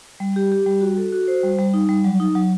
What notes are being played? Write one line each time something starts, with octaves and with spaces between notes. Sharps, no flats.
G3
G4
G4
G3
F#4
A4
F#4
C5
G3
G3
D#4
G3
F#3
D#4
F#3